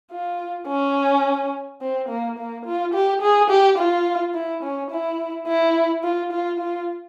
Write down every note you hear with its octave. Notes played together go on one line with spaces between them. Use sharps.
F4
C#4
C4
A#3
A#3
F4
G4
G#4
G4
F4
E4
C#4
E4
E4
F4
F4
F4